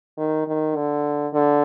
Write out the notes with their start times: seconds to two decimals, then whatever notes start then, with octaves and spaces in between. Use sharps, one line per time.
0.18 D#3
0.48 D#3
0.76 D3
1.33 D3